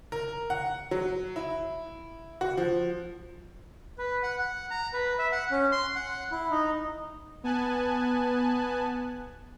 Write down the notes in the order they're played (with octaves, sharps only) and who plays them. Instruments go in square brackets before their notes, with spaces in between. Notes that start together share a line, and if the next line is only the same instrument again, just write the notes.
[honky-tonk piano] A#4
F#5
F#3
E4
F#4
F3
[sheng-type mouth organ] B4
F#5
F#5
A#5
B4
E5
F#5
C#4
C6
F#5
E4
D#4
[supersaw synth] B3 G#5 A5 F#6